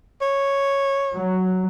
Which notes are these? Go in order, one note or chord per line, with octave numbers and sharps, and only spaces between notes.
C#5
F#3